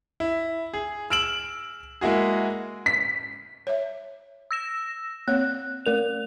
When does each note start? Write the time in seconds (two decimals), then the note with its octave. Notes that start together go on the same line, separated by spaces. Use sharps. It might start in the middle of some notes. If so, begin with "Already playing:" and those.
0.20 E4
0.73 G#4
1.10 E6 F6 D7 E7 F#7
2.01 G#3 A#3 E4 F#4 G#4
2.86 B6
3.67 C#5 E5
4.51 E6 A#6 E7
5.28 A#3 C4 C#5 F#6
5.86 A3 A#4 F7